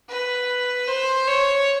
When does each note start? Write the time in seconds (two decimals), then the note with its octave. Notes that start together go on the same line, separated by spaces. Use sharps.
0.09 B4
0.88 C5
1.27 C#5